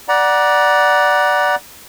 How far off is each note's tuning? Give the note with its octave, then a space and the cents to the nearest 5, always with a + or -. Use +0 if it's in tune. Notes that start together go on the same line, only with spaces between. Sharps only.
D5 +0 F#5 +5 A#5 +35